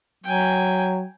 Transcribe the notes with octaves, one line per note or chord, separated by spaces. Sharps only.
F#3 G5 G#5